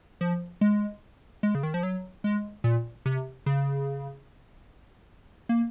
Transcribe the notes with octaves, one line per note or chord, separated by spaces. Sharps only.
F3
G#3
G#3
C#3
D#3
F3
F#3
G#3
A#2
C3
C#3
A#3